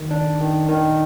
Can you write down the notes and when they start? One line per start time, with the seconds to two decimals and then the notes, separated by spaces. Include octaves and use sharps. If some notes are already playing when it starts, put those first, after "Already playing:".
Already playing: D#3
0.11 D4
0.40 D#3
0.69 D#3